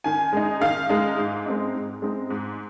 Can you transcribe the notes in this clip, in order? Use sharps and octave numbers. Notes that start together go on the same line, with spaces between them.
D#3 G#5
G#3 D#4
D#3 F5
G#3 D#4
G#2
G#3 C4 D#4
G#2
G#3 C4 D#4
G#2